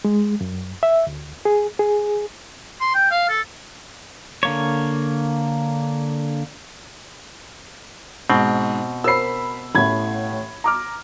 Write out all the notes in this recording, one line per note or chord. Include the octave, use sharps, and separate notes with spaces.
G#3
F#2
E5
D2
G#4
G#4
C6
G5
F5
A4
D3 A#3 C#5
G#2 B2 C4
A#4 C5 B5 E6 C7
A1 A2 B5 G#6
A#5 D6 F6